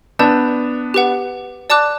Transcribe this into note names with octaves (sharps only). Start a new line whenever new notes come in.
B3 D4 D5 A5 E6 G6
G4 B4 F#5
D5 A5 D6 F#6